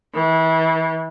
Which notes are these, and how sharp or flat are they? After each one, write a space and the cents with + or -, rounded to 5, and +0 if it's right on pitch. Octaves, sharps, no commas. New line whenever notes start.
E3 -30